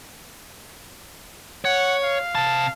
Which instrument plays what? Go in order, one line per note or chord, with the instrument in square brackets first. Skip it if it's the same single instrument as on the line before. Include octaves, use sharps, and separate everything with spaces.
[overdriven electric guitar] C#5 [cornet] F#5
[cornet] F5
[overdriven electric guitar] C3 A5